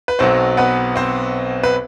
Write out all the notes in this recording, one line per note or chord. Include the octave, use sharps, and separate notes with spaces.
B4
B1 B2 F#3 C4 C5
B3 B4
C4 C5
B4